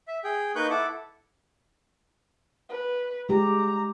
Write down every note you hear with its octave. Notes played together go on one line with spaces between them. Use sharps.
E5
G#4 G5
A#3 D#4 B4 C#6 F#6 G6
E4 A4 F#5 D6
B4
G#3 G4 A#5